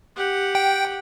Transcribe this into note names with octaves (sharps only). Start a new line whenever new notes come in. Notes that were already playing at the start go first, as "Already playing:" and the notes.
G4 F#5
G5